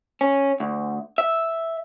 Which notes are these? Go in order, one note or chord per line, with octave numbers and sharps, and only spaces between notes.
C#4
D2
E5